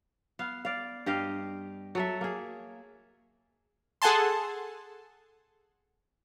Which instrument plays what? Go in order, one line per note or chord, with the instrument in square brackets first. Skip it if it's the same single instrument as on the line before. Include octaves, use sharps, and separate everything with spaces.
[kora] B3 F5
D5 F5
G2 G4 D#5 F5
F#3 A4 E5
A#3 G#4
[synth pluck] G#4 A4 F#5 G#5 A5 C6